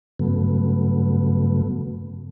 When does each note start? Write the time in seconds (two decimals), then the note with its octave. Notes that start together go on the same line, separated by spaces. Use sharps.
0.19 G2 C#3 F#3 A3 B3